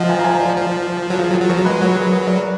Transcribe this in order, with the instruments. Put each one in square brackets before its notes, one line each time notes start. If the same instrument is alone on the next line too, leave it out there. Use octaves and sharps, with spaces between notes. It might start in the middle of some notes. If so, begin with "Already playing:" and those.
Already playing: [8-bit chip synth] F3 [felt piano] D#5 F#5
[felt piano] F5 G#5
A#5
F5 G#5
D5 F5
[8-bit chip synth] F3
F#3
[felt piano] A#4
[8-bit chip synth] F3 [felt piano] F4 G#4
[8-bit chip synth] F#3
[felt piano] F4 G#4
[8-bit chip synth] F#3
[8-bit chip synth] F3 [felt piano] F#4 A#4
[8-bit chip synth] F#3
[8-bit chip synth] G#3 [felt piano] G#4 B4
[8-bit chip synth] F#3 [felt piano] F#4 A#4
[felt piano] G#4 B4
G#4 B4
A#4 D5